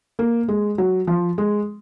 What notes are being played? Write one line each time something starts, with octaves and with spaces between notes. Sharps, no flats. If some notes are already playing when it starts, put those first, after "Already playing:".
A#3
G#3
F#3
F3
G#3